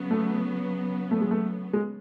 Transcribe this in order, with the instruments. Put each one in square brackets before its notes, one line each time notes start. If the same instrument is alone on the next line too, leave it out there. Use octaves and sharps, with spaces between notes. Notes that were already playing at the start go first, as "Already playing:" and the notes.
Already playing: [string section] C#3 F#3 B3
[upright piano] A3
A3
G#3
A3
G#3